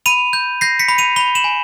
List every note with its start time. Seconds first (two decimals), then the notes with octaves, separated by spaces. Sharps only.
0.06 B5 D#7 F7
0.33 G6
0.61 G6 A#6 C7
0.79 B6 C#7
0.89 B5
0.98 D#7 F7
1.16 B5 F7 G7
1.35 E7 F#7
1.44 G#5